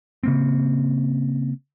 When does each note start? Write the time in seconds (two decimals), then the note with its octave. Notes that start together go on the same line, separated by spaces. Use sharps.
0.23 C#3 A#3 C4